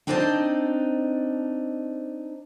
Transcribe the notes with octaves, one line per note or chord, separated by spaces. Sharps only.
C4 D4 D#4 C5 G#5 A5